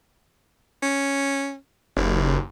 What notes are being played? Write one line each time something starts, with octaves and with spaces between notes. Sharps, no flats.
C#4
F#1 D#2